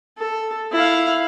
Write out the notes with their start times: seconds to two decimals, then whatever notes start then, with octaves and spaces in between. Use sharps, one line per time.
0.18 A4
0.72 E4 F5